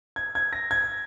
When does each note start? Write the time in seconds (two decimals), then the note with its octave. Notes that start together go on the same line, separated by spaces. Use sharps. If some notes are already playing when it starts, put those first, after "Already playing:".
0.16 G#6
0.35 G#6
0.53 A#6
0.71 G#6